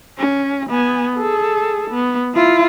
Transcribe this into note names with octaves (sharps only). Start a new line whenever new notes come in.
C#4
B3 G#5
G#4 A4
B3
E4 F4